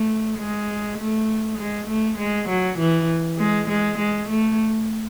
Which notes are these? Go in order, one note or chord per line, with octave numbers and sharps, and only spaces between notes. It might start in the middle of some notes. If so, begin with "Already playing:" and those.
Already playing: A3
G#3
A3
G#3
A3
G#3
F#3
E3
G#3
G#3
G#3
A3